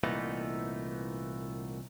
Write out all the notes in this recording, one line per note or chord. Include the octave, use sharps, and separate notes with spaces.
C2 A#2 E3 A3 B3 D#4